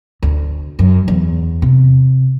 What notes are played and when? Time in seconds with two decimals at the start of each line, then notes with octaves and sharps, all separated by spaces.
0.23 D2
0.79 F#2
1.08 E2
1.62 C3